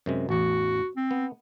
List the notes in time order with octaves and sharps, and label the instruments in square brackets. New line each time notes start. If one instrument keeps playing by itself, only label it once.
[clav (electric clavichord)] F#2 C3 G#3
[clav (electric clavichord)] A1 E2 [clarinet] F#4
[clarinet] C4
[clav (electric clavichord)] B3